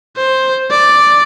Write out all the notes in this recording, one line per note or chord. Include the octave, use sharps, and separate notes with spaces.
C5
D5